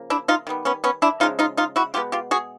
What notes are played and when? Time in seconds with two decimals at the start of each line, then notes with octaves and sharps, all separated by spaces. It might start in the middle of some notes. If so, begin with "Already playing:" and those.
Already playing: C#3 F3 A#3
0.10 D4 E4
0.28 D#4 F4
0.47 D#3 G3 B3
0.65 B3 C#4
0.84 B3 C#4
1.02 D4 E4
1.20 C#3 F3 G#3 D#4 F4
1.39 D#4 F4
1.57 D#4 F4
1.76 E4 F#4
1.94 B2 G#3 B3 F4 G4
2.12 F4 G4
2.31 F#4 G#4